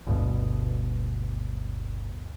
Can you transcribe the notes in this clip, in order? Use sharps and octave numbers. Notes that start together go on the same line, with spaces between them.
G1 D2 G2 B2